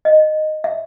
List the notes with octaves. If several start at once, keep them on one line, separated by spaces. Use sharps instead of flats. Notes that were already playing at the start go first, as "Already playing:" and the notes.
D#5
E5